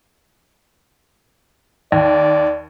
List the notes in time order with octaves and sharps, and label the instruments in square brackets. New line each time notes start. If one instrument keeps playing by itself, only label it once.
[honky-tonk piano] D#2 [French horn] D5